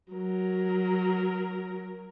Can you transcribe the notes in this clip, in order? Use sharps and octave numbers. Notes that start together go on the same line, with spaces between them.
F#3 A#4